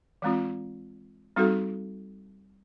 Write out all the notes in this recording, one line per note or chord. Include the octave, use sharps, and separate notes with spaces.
E3 G#3 C4 F4
G3 C4 D#4 F#4 A4